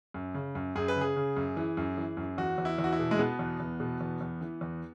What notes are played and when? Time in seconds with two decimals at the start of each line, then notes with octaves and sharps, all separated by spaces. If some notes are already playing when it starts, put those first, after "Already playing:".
0.14 F#2
0.35 C#3
0.55 F#2
0.76 F#2 G#4
0.88 B4
0.96 C#3 G#4
1.16 C#3
1.37 F#2
1.57 E3
1.77 F#2
1.98 E3
2.17 F#2
2.38 E2 F#4
2.58 E2
2.65 E4
2.78 E2
2.84 F#4
2.92 E4
2.99 B2
3.11 G#3
3.19 B2 B3
3.39 E2
3.60 E2
3.80 B2
4.01 E2
4.21 E2
4.41 E3
4.61 E2